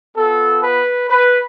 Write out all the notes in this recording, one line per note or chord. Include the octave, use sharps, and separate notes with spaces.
B3 F4 A4
B4
B4